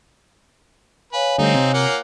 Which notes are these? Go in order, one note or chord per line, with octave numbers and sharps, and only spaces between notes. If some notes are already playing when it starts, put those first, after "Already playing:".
B4 C#5 F5 G#5
D3 G3 A3 C4 D#4
C3
A#3 F4 F#5